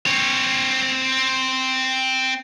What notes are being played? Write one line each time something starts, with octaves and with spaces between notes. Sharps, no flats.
C4 C#5